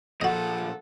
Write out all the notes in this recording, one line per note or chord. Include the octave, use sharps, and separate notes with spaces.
A#2 F3 F#4 A4 D#5 F#5